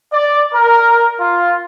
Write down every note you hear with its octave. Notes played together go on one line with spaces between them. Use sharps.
D5
A#4
F4